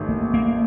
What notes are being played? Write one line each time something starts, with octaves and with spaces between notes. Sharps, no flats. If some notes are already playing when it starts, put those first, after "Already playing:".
Already playing: A1 D#3 A3
A#3
A#3